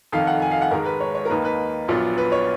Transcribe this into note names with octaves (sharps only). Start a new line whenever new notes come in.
F1 F2 D#3 F5
F#5
G#5
F5
F#5
G#2 D#3 G#3 A#4
B4
C#5
C#5
A#4
D#2 D#3 A#3 D#4 B4
B4
A#1 A#2 F#3 B3 F4
B4
C#5